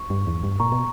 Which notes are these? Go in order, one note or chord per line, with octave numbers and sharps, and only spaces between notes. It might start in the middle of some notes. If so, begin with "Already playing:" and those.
Already playing: C#6
G2
E2
G2
A#2 A#5 C#6
B2